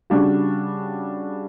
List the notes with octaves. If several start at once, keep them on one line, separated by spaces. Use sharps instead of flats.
C#3 G3 D4 F#4